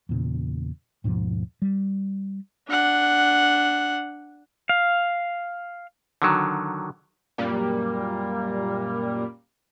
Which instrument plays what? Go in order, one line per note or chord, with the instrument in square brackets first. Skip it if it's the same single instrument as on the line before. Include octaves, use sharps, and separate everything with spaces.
[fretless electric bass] E2 A#2 C#3
D#2 G#2 B2 F3
G3
[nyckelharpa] D4 F#5
[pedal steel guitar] F5
[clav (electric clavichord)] D3 D#3 F#3
[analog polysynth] F#2 A#2 G3 A#3